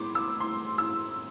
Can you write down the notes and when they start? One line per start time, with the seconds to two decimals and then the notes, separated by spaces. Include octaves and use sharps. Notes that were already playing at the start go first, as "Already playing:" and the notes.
Already playing: A2 G#3 B3 C6 D6
0.15 E6
0.40 C6
0.78 E6